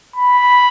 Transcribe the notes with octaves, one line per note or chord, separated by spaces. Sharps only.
B5